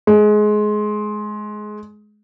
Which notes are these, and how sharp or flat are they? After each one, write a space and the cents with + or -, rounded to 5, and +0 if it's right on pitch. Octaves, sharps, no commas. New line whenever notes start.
G#3 +20